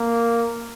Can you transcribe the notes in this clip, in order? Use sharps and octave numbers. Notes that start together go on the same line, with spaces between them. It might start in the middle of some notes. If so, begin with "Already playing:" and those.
Already playing: A#3